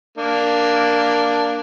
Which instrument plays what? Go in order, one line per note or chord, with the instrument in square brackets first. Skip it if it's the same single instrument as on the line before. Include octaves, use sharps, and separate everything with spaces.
[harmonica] A#3 D4